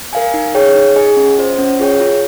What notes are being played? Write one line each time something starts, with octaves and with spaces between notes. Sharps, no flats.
A#4 F5 G#5
D#4
G#4 C#5 G5
D#4
G#4 D#5 G#5
C#4
F4 C5 D#5
C#4
F4 G#4 C#5 G5
F4